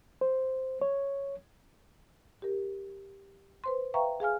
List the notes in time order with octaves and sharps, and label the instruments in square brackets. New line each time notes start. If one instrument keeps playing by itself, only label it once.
[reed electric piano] C5
C#5
[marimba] G4 A#4
B4 C5 C6
B4 E5 F5 G5 A#5 C#6
G#4 F5 G#5 F6